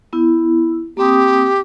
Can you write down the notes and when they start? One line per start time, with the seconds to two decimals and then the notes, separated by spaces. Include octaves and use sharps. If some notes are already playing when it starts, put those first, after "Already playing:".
0.13 B3 E4
0.97 A#3 C4 G4 D#6